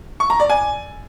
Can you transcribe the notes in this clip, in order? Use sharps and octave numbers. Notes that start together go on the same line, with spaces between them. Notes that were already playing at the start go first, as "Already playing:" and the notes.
C#6
A#5
D5
G#5